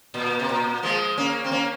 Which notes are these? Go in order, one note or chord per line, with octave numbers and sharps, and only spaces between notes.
A#2
C3
A#2
F3 G#3
A#3 C#4
C4
A#3 C#4